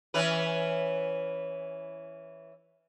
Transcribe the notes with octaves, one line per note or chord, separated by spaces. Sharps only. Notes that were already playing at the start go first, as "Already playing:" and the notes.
E3 C#4 B4